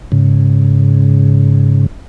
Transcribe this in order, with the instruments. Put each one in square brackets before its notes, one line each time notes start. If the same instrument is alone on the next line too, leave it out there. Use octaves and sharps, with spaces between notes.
[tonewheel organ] G#2 C#3